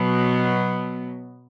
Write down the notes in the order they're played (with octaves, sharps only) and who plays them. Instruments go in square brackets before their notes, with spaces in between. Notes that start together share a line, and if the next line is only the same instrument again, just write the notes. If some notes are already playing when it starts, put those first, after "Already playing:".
Already playing: [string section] B2 F#3 B3